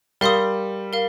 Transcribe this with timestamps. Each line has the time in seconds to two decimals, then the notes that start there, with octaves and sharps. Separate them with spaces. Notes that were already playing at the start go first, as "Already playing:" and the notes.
0.21 G3 A#4 F5 C6 D#6
0.93 A#4 F5